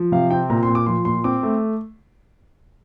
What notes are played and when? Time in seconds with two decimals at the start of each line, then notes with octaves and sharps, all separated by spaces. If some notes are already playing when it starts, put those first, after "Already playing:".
Already playing: F3
0.12 C3 F5
0.31 C4 G5
0.50 A#2 A#5
0.63 C6
0.68 A#2
0.75 D6
0.86 F3 C6
1.05 A#2 C6
1.24 C4 D6
1.43 A3